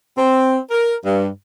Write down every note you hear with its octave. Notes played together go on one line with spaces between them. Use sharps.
C4
A#4
G2